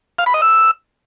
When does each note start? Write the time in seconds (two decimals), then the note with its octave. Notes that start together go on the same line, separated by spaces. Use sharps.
0.19 F5
0.26 B5
0.34 D#5
0.42 E6